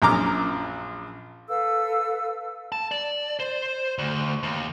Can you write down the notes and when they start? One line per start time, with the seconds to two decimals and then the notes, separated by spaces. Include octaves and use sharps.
0.02 A#1 F#2 A#5 D6 F6
1.49 A4 B4 F5 E6
2.72 A5
2.91 D5
3.40 C5
3.98 D2
4.43 D#2